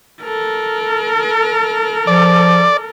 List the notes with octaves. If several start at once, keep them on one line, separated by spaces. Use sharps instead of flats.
A4 A#4
F3 D5